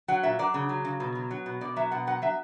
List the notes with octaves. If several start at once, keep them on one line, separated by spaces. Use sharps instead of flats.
F#3 F#5
A#2 E5
F#3 D5
C#3
F#3
C#3
B2
F#3
F#3
B2
B2 D5
F#3 E5
B2 F#5
F#3 F#5
F#3 E5